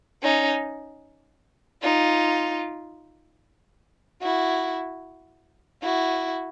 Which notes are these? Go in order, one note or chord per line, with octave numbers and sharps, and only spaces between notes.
C#4 D#4
D#4 F4
E4 F#4
E4 F#4